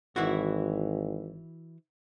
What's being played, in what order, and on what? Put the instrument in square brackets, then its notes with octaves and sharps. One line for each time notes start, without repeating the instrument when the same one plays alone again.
[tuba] G#1 [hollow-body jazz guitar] E3 E4 F#4